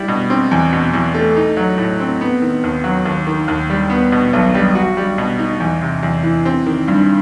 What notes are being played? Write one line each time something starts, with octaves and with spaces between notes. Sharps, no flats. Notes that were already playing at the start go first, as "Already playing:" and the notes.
Already playing: G3 E4
B2
C4
E2
B2
E2
A3
D#4
F#3
A2
C4
B3
D#3
D#2
F#3
D#2
D#3
D#2
G3
B3
B2
B1
G3
F#4
G3
B2
D#4
E2
C3
E2
E3
C4
D#3
G2